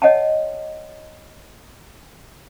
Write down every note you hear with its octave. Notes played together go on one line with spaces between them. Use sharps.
C#5 D#5 F#5 G#5 A5